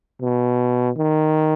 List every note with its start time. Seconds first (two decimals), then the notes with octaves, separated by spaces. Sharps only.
0.21 B2
0.97 D#3